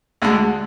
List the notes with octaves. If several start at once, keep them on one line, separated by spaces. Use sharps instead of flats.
D2 D3 G#3